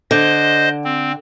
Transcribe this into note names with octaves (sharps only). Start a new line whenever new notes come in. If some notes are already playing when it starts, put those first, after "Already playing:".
D3 C5 D#5
C4